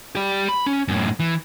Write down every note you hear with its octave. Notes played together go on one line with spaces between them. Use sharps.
G4 D5
B5
C#4
F#2 A2
E3